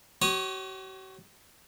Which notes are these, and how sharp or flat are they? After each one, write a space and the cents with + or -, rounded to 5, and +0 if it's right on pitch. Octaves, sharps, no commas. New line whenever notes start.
F#4 +45 C#5 -20 D#6 +0